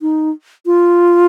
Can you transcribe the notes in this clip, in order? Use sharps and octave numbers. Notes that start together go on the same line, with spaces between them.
D#4
F4